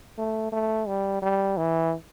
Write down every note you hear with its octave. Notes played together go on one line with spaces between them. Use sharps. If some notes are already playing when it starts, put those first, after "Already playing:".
A3
A3
G3
G3
E3